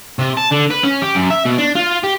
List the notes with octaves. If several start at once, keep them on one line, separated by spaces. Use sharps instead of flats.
C3
A5
D3
B4
C#4
G4
F#2
E5
B2
D4
F4
G4